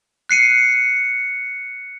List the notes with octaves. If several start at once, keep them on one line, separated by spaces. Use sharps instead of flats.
F#6 C7 C#7 D#7